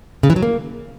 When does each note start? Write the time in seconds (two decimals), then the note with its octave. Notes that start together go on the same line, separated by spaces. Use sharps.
0.23 C#3
0.30 E3
0.36 F#3
0.42 A#3